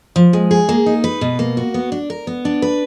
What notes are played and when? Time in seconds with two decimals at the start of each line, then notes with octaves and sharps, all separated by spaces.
0.16 F3
0.33 G#3
0.51 G#4
0.69 A#3
0.86 D#4
1.04 B4
1.21 B2
1.39 A#3
1.57 F#4
1.74 B3
1.92 D4
2.10 A#4
2.27 B3
2.45 D4
2.62 B4